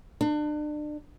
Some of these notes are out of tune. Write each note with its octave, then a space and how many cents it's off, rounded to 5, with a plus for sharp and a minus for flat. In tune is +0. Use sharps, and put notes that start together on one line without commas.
D4 +35